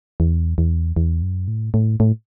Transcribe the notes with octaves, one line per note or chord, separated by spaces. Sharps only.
E2
E2
E2
F#2
A2
A2
A2